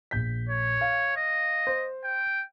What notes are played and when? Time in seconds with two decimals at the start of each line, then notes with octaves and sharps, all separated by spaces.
0.11 A#1 G6 B6
0.49 C#5
0.81 F5
1.17 D#5
1.67 C5
2.04 G5